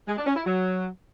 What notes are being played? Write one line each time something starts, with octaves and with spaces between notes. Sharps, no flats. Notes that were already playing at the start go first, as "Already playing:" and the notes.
G#3
D4
C#4
E4
F#3